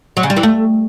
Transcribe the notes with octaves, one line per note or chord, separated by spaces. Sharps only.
F#3
C#3
G3
E3
A3